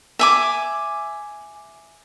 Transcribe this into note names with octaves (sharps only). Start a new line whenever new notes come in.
E5 G#5 D6